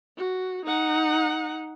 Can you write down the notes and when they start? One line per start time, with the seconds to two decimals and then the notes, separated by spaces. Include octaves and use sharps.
0.17 F#4
0.66 D#4 F#5